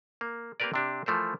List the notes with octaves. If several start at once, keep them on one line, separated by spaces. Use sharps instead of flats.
A#3
A#3 C4 G4 A#4 B4 D5
C3 D4 G4
E3 F3 A3 A#4 C5